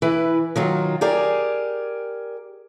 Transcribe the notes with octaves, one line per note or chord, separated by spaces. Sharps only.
E3 B4
D#3 F#3 F4
G4 G#4 A#4 D5